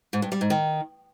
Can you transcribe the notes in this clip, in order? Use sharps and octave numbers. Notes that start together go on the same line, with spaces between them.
G#2
G2
G3
G#2
D#3